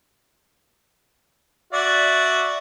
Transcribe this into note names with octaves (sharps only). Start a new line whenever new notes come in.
F#4 D5 E5